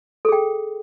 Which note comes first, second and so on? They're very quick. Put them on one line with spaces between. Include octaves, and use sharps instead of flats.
A4 G#4 G5